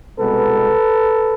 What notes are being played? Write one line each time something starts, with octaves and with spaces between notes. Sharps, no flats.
C2 B2 G#3 B3 A4 B4